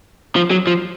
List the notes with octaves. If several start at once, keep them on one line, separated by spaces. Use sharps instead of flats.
F3
F#3
F3